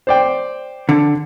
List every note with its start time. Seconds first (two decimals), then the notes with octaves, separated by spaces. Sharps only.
0.07 C5 D5 G5
0.89 D3